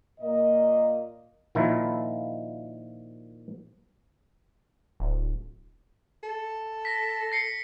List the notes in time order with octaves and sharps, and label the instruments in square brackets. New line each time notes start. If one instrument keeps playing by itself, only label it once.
[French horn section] A#2 A#3 D#5
[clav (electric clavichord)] A#2 D#3 F3 E4 F4
[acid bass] D1
[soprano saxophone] A4
[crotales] A#6 B6
A#6 C7 C#7